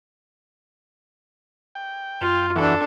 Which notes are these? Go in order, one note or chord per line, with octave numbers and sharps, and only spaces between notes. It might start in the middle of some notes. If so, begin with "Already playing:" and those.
G5
F#2 F4
E2 E3 D4 F#4 A4